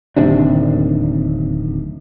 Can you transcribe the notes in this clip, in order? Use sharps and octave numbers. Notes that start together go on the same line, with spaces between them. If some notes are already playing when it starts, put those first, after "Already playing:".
D1 D#2 C3 D4